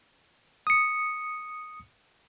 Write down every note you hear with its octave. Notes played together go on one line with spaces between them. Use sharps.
D#6 C#7